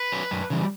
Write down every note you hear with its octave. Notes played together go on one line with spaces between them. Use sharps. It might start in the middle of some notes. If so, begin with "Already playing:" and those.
Already playing: B4
F#3 C#4
F#2
C#3 E3 G3